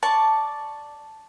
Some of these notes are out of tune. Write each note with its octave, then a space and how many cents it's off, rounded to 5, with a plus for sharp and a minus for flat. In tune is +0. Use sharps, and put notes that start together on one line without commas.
D5 +0 A5 +0 C#6 +0